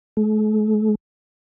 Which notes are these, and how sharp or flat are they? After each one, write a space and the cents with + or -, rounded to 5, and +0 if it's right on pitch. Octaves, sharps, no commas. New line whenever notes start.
A3 -45